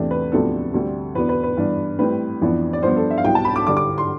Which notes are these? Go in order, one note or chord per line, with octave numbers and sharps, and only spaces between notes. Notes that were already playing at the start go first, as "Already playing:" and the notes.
Already playing: E2 C3 E3 A3 D4
B4
D2 C3 F3 B3 D4 A4
D2 D3 G3 C4
E2 B2 B3 D4 B4
B4
B4
G2 E3 B3 D4
A2 G3 C4 B4
F2 E3 B3 D4
D5
G2 F3 B3 D4 C5
A4
E5
F5
C2 B2 B3 G5
A5
B5
D6
G2 D3 G3 D6
D6
C6